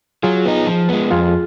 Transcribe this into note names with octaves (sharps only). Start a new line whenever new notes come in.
F#3 F4 G#4
B3 D#4
F3
G#3 B3
F2 F4 G#4